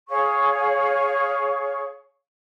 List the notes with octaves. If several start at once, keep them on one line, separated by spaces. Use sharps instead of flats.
G#4 C#5 F5 C#6